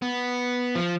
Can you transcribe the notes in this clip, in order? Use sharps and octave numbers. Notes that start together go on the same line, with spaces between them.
B3
F3